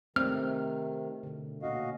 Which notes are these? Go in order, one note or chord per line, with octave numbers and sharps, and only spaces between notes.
C3 D#3 A3 C4 F6
B2 D3
A#2 C#4 D#4 F#4 D#5 F5